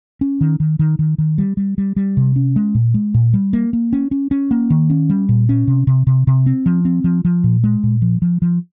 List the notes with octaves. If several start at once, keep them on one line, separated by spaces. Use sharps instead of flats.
C#4
D#3
D#3
D#3
D#3
D#3
G3
G3
G3
G3
C3
C#4
G#3
A#2
G#3
A#2
G3
A#3
A#3
C#4
C#4
C#4
A#3
D#3
C#4
G3
A#2
C#4
C3
C3
C3
C3
C4
F3
C4
F3
F3
A#2
G#3
A#2
F3
F3
F3